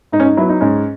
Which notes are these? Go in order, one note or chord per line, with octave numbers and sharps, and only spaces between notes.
G#2 D#4
C#4
D#4
F#3 B3 E4
D#4
G#2 C#4